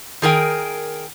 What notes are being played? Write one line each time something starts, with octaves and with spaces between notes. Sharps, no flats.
D#3 G#4 A#4 G5